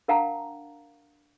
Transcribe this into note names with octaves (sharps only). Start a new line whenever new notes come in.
D4 A#4 F5 F#5 A5 A#5